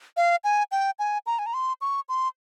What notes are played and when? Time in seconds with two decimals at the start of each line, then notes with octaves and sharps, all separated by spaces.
0.17 F5
0.44 G#5
0.72 G5
0.99 G#5
1.26 A#5
1.39 G#5
1.46 A#5
1.54 C6
1.81 C#6
2.09 C6